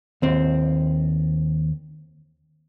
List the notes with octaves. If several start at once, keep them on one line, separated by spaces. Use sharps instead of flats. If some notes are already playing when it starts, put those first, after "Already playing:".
D#2 C4